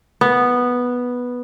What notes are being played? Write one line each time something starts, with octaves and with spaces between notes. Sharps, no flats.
B3